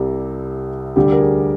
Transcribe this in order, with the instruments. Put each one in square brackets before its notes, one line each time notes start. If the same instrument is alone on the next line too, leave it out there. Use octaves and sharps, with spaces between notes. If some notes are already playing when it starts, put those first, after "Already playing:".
Already playing: [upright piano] C2 C3 G3
D2 D3 G3 G4
A#4
G#4